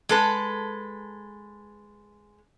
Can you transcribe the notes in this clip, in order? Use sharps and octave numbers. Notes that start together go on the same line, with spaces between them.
G#3 A4 B4